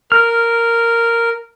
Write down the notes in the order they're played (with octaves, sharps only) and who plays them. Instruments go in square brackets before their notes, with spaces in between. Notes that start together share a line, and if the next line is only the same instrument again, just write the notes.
[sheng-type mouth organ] A#4 [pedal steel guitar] F6